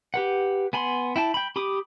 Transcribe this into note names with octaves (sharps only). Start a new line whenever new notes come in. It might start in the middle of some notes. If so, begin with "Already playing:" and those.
G4 B4 F#5
B3 G#5 B5 C6
E4 G5 A5
G5 B5
G4 B5 D6 D#6